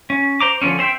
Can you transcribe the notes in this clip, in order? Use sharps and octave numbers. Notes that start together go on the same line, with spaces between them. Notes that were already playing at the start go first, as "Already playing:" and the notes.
C#4
C5 A#5 D6
D3 F3 A3 C4 C#4
C4 C5 E5 G5